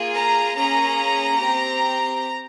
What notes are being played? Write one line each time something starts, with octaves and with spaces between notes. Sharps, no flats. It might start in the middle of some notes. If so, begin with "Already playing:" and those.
Already playing: A#3 F4 G#4
A#5
A#3 C#4 G#4 A#5
C4 G4